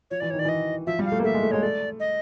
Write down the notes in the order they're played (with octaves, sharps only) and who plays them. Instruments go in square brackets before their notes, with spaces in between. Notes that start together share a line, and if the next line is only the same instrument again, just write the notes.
[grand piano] F3 [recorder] C#5
[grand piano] E3 [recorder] D5
[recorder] C#5
[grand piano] D#3
[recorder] D5
[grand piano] E3 [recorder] D#5
[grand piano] F3 [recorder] E5
[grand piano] G3
[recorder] F5
[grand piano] A3
A#3
[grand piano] A3 [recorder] E5
[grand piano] G#3
A3
[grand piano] G#3 [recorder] C#5
[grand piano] A3 [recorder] D5
[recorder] D#5